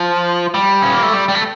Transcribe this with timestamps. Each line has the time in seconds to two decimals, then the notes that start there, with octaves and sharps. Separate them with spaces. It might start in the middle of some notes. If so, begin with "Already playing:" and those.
Already playing: F3
0.54 G3
0.82 C#4
0.93 A#3
1.03 A3
1.13 G3
1.28 G3
1.35 A3